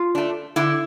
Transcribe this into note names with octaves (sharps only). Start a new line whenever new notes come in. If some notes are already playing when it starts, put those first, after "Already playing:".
Already playing: F4
A3 D4
D3 E4